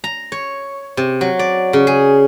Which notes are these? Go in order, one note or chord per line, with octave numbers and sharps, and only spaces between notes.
A#5
C#5
C3
F#3
D5
C#3
G#4